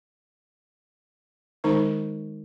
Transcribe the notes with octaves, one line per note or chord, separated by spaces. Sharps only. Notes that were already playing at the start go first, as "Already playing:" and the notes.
D#3 G#3 D#4 C5 C#6